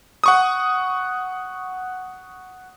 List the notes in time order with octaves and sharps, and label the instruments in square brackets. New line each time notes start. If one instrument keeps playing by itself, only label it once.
[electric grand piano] F#5 C#6 D#6